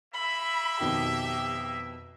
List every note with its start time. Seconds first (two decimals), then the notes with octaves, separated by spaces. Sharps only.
0.14 A#3 E5 B5
0.80 F2 B2 D#3 G4